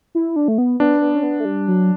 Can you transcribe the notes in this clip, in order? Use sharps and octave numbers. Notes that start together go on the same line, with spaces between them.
E4
D4
A3
B3
B3 D4
B3
C#4
B3
A3
G3
F#3